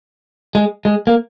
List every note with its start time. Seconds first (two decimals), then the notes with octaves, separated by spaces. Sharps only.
0.55 G#3
0.85 G#3
1.07 A#3